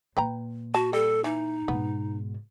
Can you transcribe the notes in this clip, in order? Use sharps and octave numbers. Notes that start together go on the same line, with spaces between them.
A#2 B4 G5 A#5
F#4 A5
G3 A4
E3 D#4
G#2 B2 B3